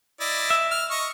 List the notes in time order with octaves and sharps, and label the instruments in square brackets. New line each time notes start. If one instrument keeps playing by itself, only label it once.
[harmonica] E4 D5 D#5
[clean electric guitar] E5
[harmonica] F6
D#5 C#6